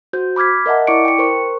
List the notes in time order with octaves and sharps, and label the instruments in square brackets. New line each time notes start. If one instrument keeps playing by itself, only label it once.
[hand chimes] F#4 C5 G6
B5 D6 F6 G#6 B6
A#4 D#5 E5 F#5 A5
E4 D5 C#6 D6 C#7 D7
G5 C#7
A#4 C5 C#6